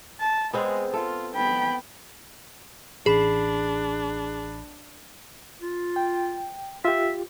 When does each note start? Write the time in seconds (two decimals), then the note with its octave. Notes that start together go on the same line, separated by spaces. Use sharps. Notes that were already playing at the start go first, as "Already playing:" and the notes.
0.20 A5
0.53 G#3 B3 C4 G#4
0.93 F4 A4
1.35 B3 G5 B5
3.06 A1 D4 G#4 B5
5.61 F4
5.96 G5
6.85 F4 G4 E5